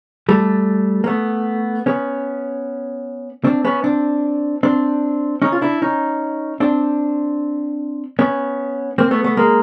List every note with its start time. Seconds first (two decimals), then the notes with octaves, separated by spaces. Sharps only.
0.29 G3 A3
1.04 A#3
1.07 A3 B3
1.86 B3 C#4
3.44 C4 D4
3.65 B3 C#4
3.84 C4 D4
4.63 C4 D4
5.42 C#4 D#4
5.52 F4
5.61 D4 E4
5.82 C#4 D#4
6.60 C4 D4
8.19 B3 C#4
8.98 A#3 C4
9.11 A3 B3
9.24 A3 B3
9.37 G#3 A#3